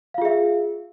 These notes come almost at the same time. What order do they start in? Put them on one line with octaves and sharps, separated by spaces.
F5 F4 G#4 E5